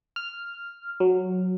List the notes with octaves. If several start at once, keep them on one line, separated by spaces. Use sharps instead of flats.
F6
F#3